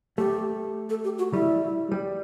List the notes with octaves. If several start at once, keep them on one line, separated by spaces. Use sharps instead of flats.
A3 G4
A4
G4
F#4
G3 E4
G3